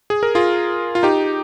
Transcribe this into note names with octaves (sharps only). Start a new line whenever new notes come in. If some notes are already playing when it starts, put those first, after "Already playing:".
G#4
A#4
F4 G#4
F4
D#4 G4